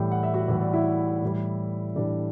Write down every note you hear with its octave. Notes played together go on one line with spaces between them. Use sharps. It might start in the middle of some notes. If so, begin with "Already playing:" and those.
Already playing: A2 E3 G3 G4 G5
F#5
E5
F#4 F#5
A2 E3 G3 E5
D5
E4 E5
A2 E3 G3
A2 E3 G3 D4 D5